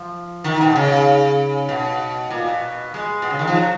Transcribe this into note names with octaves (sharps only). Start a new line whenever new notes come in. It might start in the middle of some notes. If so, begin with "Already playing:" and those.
Already playing: F3
D#3
B2
C#3
B2
A#2
B2
G#3
B2
C#3
D#3
F3
F#3